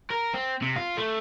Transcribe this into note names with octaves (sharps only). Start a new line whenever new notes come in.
A#4
C4
C3
F4
A3